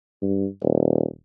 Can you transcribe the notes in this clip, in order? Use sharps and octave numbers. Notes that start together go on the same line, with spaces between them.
G2
D#1